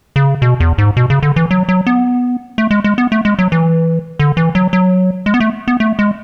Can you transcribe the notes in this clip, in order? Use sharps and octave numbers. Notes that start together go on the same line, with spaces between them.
C#3
B2
E2
G#2
B2
C#3
D3
E3
F#3
F#3
B3
A3
G#3
G#3
B3
A3
G#3
F#3
E3
D3
E3
F#3
F#3
G#3
B3
A3
B3
A3
G#3